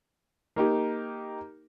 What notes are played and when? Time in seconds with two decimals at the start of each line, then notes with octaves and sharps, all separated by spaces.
0.56 A#3 D#4 G4